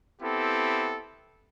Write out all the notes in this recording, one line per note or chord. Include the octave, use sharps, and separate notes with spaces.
B3 C4 E4 G4 A4